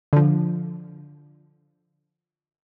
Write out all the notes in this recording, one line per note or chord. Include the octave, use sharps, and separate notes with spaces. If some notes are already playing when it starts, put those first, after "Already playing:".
D3 F3